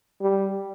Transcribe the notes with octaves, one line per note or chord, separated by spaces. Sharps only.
G3